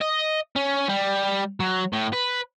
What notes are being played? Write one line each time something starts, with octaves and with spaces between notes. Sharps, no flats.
D#5
C#4
G3
F#3
A2
B4